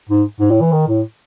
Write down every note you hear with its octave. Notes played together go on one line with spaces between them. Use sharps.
G#2
G#2
A2
E3
D#3
A2